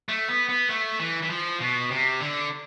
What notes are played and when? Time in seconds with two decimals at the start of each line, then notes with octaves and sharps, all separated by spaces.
0.09 A3
0.28 B3
0.49 B3
0.69 A3
0.99 E3
1.22 E3
1.30 F3
1.60 B2
1.91 C3
2.21 D3